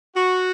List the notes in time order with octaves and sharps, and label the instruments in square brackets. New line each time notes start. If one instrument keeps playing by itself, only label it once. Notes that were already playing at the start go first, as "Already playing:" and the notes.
[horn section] F#4